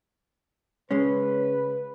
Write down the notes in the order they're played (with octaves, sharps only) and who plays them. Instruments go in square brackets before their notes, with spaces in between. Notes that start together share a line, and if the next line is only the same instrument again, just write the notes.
[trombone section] C#3 B4 [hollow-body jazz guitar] G#3 C#4